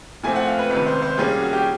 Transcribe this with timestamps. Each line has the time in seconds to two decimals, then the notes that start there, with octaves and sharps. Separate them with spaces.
0.23 A#2 F3 A3 C4 G#5
0.36 F#5
0.47 F5
0.59 B4
0.70 C#2 C3 D#3 B4
0.86 C5
1.02 C5
1.18 A#2 G3 A#3 C#4 G#4
1.41 F#4
1.53 G4